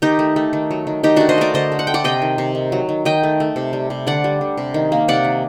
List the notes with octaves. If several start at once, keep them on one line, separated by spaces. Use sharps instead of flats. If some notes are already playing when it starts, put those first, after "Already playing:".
D#3 D#4 G4
A3
A3
D#3
F#3
D#3
D#3 D#4 G4
A3 D4 F#4
C5 D#5
A3 A#4 D5
D3 C5 D#5
A3
F#5
A3 G5
D5 F#5
C3 D#5 G5
D#3
C3
D#3
F#3
D#3
D#3 D#5 G5
A3
A3
C3
G3
C3
D3 D5 F#5
G3
D3
C3
D#3
A#3
C3 D5 F#5
D#3